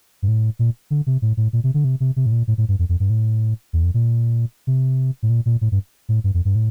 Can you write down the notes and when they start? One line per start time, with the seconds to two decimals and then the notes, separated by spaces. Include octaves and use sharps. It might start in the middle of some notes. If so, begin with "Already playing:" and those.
0.22 G2
0.28 A2
0.59 A#2
0.90 D3
1.07 C3
1.22 A2
1.37 A2
1.53 A#2
1.64 C3
1.74 D3
1.85 C3
2.00 C3
2.16 C3
2.26 A2
2.32 A#2
2.48 A2
2.58 A2
2.68 G2
2.79 F2
2.89 F2
3.00 G2
3.10 A2
3.73 E2
3.83 F2
3.94 A#2
4.67 C3
5.23 A2
5.30 A#2
5.46 A#2
5.61 A2
5.72 G2
6.09 A2
6.24 G2
6.34 F2
6.45 G2
6.55 A2